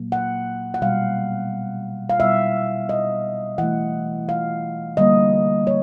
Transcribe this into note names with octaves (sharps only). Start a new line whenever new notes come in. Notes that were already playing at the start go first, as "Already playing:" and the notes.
Already playing: A#2 F#3 A#3
F#5
F#5
B2 G3 B3 F5
F5
B2 G3 B3 E5
D#5
E3 A3 F#5
F5
D3 G3 A#3 D#5
C#5